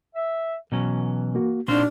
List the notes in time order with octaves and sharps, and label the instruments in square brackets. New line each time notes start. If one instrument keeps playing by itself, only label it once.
[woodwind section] E5
[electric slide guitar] B2 F#3 C#4 [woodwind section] E3
[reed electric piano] A#3 F#4
[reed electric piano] A#2 D#4 [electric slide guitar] C4 F4 C5 [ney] D4 [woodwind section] F#4 F6